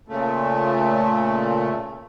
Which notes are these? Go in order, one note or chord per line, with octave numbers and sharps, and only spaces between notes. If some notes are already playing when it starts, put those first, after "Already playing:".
A#2 C#3 A3